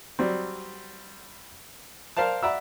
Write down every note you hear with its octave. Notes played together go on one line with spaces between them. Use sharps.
F#3 G3 C4
A#4 C5 D5 F5 A5
D5 E5 F#5 A#5 B5 E6